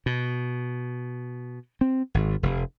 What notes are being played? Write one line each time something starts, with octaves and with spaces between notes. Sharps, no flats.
B2
C4
G#1
F1